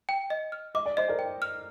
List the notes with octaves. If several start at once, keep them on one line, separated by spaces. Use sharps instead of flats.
G5
D#5
F6
D#5 D6
D5
C5 D#5
A#4 D5
G5
F6